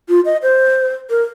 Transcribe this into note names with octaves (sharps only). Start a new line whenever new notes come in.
F4
D#5
C5
A#4